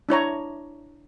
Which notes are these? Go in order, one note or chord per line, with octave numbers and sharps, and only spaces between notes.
D4 E4 C#5 A#5